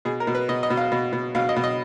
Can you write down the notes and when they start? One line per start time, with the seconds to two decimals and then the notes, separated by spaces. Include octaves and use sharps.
0.05 B2 G#4
0.20 A#4
0.27 B2
0.35 B4
0.49 B2 D#5
0.63 D#5
0.70 B2
0.77 F5
0.92 B2
1.13 B2
1.35 B2 F5
1.49 D#5
1.56 B2
1.64 D#5